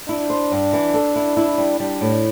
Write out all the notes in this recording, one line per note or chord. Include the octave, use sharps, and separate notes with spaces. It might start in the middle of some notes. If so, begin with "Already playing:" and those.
D4 E4
C5
G2
E3
A4
E4
E4
G3
G3 D4
A2